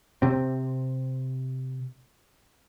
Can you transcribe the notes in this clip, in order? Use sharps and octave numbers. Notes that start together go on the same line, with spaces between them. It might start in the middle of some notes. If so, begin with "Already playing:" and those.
C3 C4